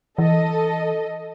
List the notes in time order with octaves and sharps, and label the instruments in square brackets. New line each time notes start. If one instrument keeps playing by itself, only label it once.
[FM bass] E3 [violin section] A4 D#5